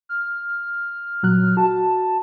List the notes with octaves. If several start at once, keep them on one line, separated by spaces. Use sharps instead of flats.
F6
A#2 F#3 F#6
F#4 A5